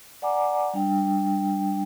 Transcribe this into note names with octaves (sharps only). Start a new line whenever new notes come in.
D5 F#5 G#5 A#5 D6
G3 D4 G5